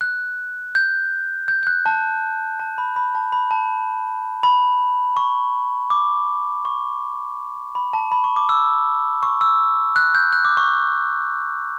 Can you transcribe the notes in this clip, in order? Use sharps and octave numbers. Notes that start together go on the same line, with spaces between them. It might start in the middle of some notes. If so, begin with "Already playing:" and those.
F#6
G6
G6
G6
F#6
A5
A5
B5
B5
A5
B5
A5
B5
C#6
D6
C#6
B5
A5
B5
C#6
D6
E6
C#6
E6
F#6
G6
F#6
D6
C#6